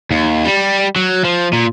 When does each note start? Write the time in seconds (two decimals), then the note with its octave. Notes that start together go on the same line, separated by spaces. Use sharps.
0.11 D#2
0.45 G3
0.96 F#3
1.24 F3
1.53 A#2